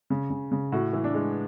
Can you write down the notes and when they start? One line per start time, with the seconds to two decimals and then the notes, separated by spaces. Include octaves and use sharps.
0.10 C#3
0.30 C#3
0.52 C#3
0.72 A2 F#4
0.93 E3
1.04 D4
1.14 G#3